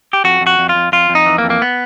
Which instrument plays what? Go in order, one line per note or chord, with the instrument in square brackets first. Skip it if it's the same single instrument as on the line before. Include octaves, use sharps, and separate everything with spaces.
[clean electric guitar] G4
F2 F#4
F2
F#4
F2
F4
F2
F2 F4
F2
D#4
E3
A#3
F2
A#3
B3